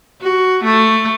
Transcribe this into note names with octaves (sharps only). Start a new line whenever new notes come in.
F#4
A3